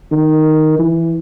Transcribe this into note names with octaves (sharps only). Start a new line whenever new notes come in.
D#3
E3